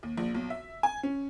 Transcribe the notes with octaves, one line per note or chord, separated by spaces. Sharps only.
D#2
A#1
B1
E5
G#5
C#4